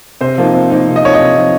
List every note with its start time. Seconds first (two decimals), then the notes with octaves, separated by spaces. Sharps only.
0.21 C3 C5
0.38 F3 A#3 D#4
0.54 C3
0.70 F3 A#3 D#4
0.87 C3
0.96 D#5
1.03 F3 A#3 D#4 C#5
1.14 D#5
1.19 C3
1.36 F3 A#3 D#4